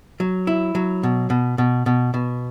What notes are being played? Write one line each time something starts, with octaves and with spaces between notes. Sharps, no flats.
F#3
E4
F#3
B2
B2
B2
B2
B2